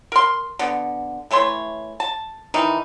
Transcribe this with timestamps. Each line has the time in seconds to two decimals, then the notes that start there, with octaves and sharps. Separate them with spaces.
0.12 A#4 C6
0.59 D3 B3
1.31 E3 A3 C#5 C6
2.00 A5
2.54 D#3 E3 D#4